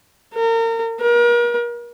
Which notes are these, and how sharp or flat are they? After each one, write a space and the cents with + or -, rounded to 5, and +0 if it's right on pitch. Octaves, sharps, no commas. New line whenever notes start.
A#4 -35
A#4 +40